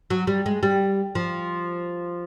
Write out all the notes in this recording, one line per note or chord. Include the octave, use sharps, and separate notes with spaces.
F#3
G3
G#3
G3
F3